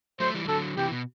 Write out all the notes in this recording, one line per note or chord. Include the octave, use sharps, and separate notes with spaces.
F#3 A3 C5
E3 G3
G3
D3 F#3 A4
C3 E3 G4
B2